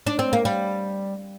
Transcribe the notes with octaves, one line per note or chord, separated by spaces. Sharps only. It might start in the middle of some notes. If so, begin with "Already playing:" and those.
D4
C4
A#3
G3